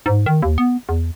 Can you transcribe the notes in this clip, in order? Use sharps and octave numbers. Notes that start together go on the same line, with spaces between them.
G#2
D#3
D#2
B3
E2